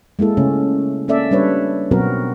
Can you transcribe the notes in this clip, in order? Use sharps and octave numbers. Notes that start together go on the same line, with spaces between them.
G#3 A#3 E4 A4
C#3 A3 C#4
A#3 C#4 A4 D5 E5
G3 D4 B4 C#5
B2 F#3 B3 C4 F#4 A#4